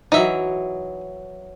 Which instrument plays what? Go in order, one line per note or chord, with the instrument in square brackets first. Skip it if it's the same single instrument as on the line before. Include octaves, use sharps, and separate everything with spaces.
[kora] E3 F#3 [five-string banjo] D#4 E5